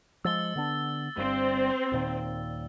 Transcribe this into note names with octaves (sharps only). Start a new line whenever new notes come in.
F3 G#3 E6 A6 G7
D3 B3 D4
G1 G2 C4
D#1 A#2 D#3